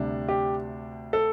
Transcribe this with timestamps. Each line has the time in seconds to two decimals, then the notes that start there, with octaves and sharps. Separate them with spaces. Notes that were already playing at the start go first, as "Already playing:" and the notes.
Already playing: D2 C3 G3 D4
0.28 G4
1.13 A4